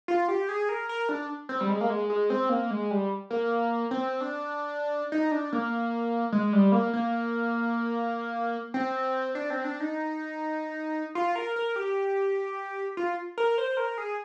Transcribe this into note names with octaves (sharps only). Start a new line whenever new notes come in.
F4
G4
G#4
A#4
A#4
D4
C4
G3
G#3
A#3
G#3
G#3
C4
A#3
G#3
G3
A#3
C4
D4
D#4
D4
A#3
G#3
G3
A#3
A#3
C4
D4
C4
D4
D#4
F4
A#4
A#4
G4
F4
A#4
C5
A#4
G#4